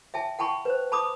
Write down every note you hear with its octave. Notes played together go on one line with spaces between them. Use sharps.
E5 G5 A5
F#5 G5 A5 B5 C#6
B4 C5
A5 B5 D6 D#6